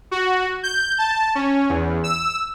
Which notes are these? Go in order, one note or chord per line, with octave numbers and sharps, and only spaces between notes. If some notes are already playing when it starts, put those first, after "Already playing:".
F#4
G6
A5
C#4
E2
E6